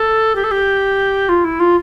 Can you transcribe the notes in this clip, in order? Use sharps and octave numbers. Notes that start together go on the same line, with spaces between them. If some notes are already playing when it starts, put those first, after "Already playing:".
Already playing: A4
G4
A4
G4
F4
E4
F4